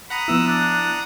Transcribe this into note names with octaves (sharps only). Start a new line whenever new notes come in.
F#5 A#5 B5 D#6
F3 B3 E4 E6
D4